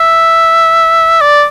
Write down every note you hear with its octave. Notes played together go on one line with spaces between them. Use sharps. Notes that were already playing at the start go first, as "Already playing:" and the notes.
Already playing: E5
D5